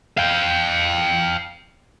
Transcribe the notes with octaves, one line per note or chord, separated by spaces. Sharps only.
F5 G5